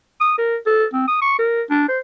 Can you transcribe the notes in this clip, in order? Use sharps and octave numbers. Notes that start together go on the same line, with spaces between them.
D#6
A#4
A4
C4
D#6
C#6
A#4
D4
C5